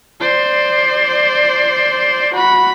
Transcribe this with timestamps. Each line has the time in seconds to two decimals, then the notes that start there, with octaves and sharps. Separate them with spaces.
0.20 C5 D5
2.33 F#4 B5